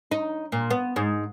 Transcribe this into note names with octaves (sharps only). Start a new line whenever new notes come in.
D#4
A#2
B3
G#2